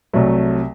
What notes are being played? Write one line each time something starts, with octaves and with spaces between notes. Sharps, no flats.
C2 C3 F#3 A3